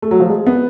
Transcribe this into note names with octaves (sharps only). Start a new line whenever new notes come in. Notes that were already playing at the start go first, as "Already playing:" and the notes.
A3
F#3
F3
G#3
B3